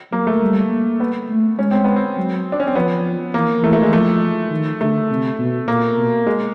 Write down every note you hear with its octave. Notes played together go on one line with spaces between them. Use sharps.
F#3 A#3
A3
G3
A#3
B3
A3
G#3 C#4
C4
B3
C4
F#3
D4
C#4
C4
F3 B3
E3 A#3
E3 A3
A3
G#3
F3 A3
D#3
D3 A3
C3
B2
A#2 A#3
B2
G#3